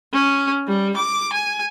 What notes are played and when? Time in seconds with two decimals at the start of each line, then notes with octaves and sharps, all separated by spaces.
0.13 C#4
0.67 G3
0.97 D6
1.33 G#5